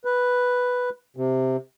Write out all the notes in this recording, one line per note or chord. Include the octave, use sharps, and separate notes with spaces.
B4
C3